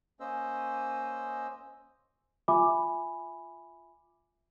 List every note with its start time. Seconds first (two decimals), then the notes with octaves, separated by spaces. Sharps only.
0.20 A#3 C#4 C5 D#5 E6
2.48 F4 E5 G#5 B5 D6